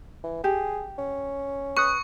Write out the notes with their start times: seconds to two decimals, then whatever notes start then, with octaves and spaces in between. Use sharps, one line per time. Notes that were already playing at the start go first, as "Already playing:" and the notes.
0.24 E3
0.44 G4 G#4
0.98 C#4
1.77 B4 C#6 D#6 F#6 C#7